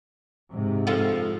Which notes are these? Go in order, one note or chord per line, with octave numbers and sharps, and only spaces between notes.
G#2 C3
F3 F4 A4